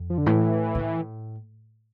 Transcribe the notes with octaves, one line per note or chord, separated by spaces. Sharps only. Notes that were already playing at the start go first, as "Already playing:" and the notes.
Already playing: F2
F3
D3
A2 E3
B2
A2